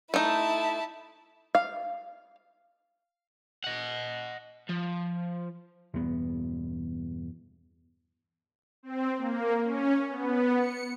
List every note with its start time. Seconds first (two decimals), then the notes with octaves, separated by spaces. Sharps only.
0.14 A3 D#4 E4 A5
1.55 F5
3.64 D#5 F#5
4.69 F3
5.94 E2 G2 B2 B3
8.83 C4
9.17 A#3
9.65 C#4
10.09 B3
10.57 C#7